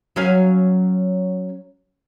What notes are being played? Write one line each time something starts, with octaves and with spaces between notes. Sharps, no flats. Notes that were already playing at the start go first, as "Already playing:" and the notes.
F#3 C#4 F5